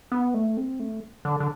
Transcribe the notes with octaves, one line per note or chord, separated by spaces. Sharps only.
B3
A3
C4
A3
D3
D3